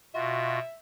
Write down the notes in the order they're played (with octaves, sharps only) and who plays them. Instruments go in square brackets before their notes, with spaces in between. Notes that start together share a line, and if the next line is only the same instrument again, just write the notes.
[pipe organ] B2 [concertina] F4 F#4 [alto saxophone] E5